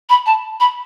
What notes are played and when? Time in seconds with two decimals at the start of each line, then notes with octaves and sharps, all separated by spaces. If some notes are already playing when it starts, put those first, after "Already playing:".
0.09 B5
0.26 A5
0.60 B5